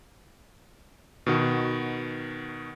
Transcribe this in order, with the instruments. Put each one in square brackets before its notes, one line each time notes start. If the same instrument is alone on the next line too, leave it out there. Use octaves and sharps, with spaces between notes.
[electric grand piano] B2 D#3 F#4